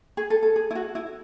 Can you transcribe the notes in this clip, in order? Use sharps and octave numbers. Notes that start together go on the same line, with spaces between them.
G#4
A4
A4
G#4
E4
F#4
E4